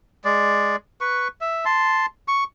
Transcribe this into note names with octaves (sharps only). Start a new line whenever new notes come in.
G#3 D5
B4 C#6
E5
A5 C6
C#6